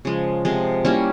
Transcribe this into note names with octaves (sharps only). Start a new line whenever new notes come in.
C#3 F3 G#3
C3 F3 G#3
G3 A#3 C#4 E4